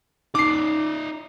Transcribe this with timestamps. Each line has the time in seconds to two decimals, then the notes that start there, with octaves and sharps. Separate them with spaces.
0.35 D#4 D5 D6 C7